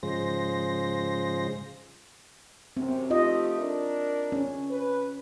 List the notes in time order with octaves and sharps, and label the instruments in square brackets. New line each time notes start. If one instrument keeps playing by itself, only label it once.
[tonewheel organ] G#2 C#3 F3 G#3 C5 A#6
[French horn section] F#2 C3 [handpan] C4
[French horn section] A3 G4 [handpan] F4 D#5
[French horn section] D4 A#4
[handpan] C#4
[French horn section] B4